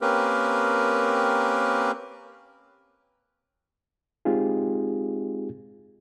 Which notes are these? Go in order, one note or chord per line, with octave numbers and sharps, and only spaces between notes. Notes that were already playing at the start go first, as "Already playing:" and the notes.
A#3 C4 C#4 G4 A#4 B4
G#3 C4 D#4 F4 G4 G#4